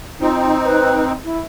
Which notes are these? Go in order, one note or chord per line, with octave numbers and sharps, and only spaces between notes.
C4 D#4 F4
B4
E4